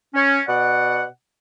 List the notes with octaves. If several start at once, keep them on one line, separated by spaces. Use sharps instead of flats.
C#4
B2 D5 F#5